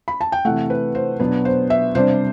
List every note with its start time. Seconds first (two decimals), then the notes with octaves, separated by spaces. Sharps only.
0.08 B5
0.21 A5
0.32 G5
0.45 C3 E3 A3 F#5
0.70 B4
0.95 C5
1.20 B2 F#3 B3 D4 B4
1.45 C5
1.70 E5
1.95 C3 G3 D4 C5